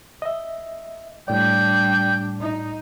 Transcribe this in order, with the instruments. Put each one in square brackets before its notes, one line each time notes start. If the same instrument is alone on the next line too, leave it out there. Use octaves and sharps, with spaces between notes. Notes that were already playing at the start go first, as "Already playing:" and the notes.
[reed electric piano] D#5 E5
[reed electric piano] A2 D5 [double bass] G3 D4 [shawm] G5
[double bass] D#4